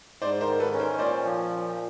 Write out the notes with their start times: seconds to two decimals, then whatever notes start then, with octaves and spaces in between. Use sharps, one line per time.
0.22 G#2 C5 D5
0.41 A#4 C5
0.47 D#3
0.60 A4 B4
0.73 C#4
0.80 A#4 C5
0.98 A#2 C5 D5
1.24 F3
1.50 A#2